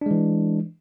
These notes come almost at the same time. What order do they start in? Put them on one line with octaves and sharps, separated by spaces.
D4 G#3 E3